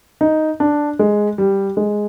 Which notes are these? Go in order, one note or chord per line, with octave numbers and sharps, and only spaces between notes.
D#4
D4
G#3
G3
G#3